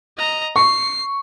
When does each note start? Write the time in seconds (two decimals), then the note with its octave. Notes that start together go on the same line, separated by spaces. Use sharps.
0.18 D#5 A#5
0.56 C#6 C7